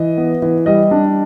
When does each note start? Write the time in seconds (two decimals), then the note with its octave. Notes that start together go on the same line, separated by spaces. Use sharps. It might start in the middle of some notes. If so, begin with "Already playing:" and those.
Already playing: E3 D#5
0.17 B3
0.42 E3
0.66 G3 D#5
0.91 D4